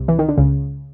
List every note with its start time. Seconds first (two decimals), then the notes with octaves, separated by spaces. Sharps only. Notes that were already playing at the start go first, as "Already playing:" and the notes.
Already playing: C2 C3
0.08 E3
0.19 D#3
0.29 D3
0.38 C#2 C#3